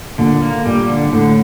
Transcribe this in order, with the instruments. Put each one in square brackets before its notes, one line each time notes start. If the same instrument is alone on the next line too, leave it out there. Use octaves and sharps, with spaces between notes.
[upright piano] A#2 [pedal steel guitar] D3
[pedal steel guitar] A#3
[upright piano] A#2 [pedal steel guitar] G3
[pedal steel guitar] D3
[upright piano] A2 [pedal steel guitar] D3